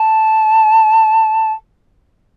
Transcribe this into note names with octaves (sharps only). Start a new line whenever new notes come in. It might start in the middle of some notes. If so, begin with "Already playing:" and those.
Already playing: A5